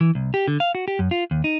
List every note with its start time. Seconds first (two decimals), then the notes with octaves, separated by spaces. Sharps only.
0.01 E3
0.15 C2
0.34 G4
0.48 D3
0.60 F5
0.75 F#4
0.88 G4
0.99 F#2
1.11 F4
1.31 D#2
1.44 D#4